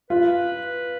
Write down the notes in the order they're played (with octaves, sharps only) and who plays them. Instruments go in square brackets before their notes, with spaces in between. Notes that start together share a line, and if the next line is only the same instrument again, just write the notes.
[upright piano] F4 [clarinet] B4